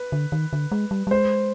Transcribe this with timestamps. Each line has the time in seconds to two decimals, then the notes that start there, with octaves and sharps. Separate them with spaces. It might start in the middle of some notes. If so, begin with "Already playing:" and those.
Already playing: B4
0.12 D3
0.32 D#3
0.53 D3
0.72 G#3
0.91 G3
1.07 G3
1.11 G#3 C5